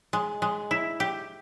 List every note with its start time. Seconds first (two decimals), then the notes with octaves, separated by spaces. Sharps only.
0.13 G#3
0.42 G#3
0.71 E4
1.00 G4